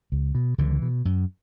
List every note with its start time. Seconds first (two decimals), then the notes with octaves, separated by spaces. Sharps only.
0.12 C#2
0.35 B2
0.58 C#2 D3 E3
0.82 B2
1.05 F#2